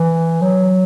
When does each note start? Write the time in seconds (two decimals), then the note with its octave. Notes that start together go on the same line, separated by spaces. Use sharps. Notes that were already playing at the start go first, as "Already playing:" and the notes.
Already playing: E3
0.42 F#3